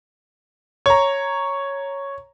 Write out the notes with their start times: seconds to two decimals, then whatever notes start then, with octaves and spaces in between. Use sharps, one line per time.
0.86 C#5 A#5